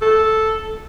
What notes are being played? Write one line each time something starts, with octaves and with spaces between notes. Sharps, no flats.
A4